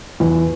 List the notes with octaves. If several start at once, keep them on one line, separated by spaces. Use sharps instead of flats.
E2